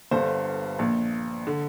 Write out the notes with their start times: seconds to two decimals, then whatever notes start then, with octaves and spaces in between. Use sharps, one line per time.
0.11 G1 G2 D3 C5
0.78 A#1 A#2
1.47 D3